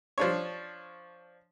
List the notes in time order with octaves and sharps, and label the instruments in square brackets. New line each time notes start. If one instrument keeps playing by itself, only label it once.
[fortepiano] F3 D4 C#5